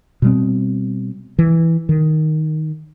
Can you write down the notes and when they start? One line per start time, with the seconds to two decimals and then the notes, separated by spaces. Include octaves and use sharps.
0.22 B2 G3 C4
1.39 E3
1.89 D#3